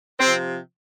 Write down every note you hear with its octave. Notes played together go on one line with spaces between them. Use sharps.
C3 F3 C4